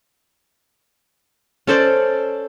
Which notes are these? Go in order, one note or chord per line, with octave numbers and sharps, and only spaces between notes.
C#4 A4 C5 D5